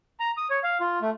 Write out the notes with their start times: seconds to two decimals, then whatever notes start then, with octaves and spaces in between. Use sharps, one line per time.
0.20 A#5
0.37 D#6
0.50 C#5
0.64 F5
0.81 F4
1.02 A3